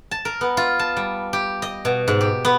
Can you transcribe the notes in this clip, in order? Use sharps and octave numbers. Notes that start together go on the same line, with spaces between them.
A5
A#4
B3
F4
A5
G3
G4
D#5
B2
G#2
G4
B3